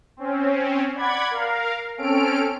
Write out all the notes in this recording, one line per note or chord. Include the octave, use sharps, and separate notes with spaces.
C4 C#4
D5 F#5 B5 G#6
A#4 F5
C4 C#4 A4 F6 D7